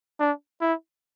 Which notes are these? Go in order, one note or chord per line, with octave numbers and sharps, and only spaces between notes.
D4
E4